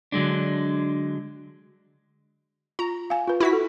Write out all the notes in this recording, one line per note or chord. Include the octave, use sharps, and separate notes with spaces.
D3 F#3 G#3 D4
F4 A#5
F5 G#5
F4 B4
E4 F#4 B6
A4